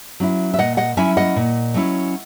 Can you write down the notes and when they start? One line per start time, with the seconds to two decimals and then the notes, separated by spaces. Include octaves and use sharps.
0.20 F#3 C#4 E4
0.54 E5
0.58 A#2 D#5 F#5
0.77 D#5 F#5
0.97 F#3 C#4 E4 E5 G#5
1.17 D#5 F#5
1.36 A#2
1.74 F#3 C#4 E4